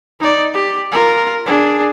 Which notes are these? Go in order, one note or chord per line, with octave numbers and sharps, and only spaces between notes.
D#4 D5
G4
F4 A#4
D4 G#4